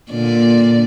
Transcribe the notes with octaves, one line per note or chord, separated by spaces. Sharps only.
A#2 D3 D5